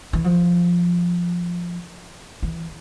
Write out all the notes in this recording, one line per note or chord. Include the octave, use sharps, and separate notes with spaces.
E3
F3
E3